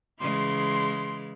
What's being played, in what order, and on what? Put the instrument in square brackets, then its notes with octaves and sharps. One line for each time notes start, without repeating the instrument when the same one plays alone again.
[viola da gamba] C#3 E3 G#3 [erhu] C6